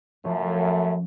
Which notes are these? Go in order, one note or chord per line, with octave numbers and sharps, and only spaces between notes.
F#2 F3 A3 C#4